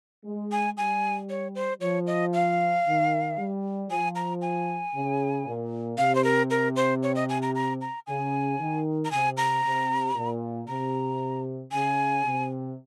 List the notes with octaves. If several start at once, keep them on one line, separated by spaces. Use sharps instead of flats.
G#3
G#5
G3 G#5
C#5
C5
F3 C#5
D#5
F5
D#3
G3
F3 G#5
A#5
G#5
C#3
A#2
C3 F5
C5
A#4
A#4
C5
C#5
D#5
G#5
A#5
A#5
A#5
C#3 G#5
D#3
A#5
C3 G#5
A#5
C3
A#2
C3 A#5
C#3 G#5
C3